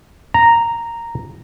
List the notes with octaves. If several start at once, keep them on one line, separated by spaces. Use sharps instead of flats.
A#5